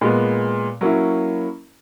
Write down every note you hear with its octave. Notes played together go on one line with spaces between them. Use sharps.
A#2 G#3 B3
F#3 A#3 C#4 E4